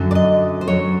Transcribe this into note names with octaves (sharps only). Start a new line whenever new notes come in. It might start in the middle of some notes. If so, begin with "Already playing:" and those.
Already playing: F#2 D3 F#3
D5
D#5
C5
F#2 D3 F#3 C#5